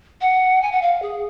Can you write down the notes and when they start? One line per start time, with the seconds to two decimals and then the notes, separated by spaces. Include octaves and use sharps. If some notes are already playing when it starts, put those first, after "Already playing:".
0.21 F#5
0.62 G#5
0.72 F#5
0.82 F5
1.02 G#4